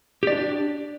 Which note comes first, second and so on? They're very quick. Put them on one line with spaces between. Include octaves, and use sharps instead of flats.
G4 D5 D4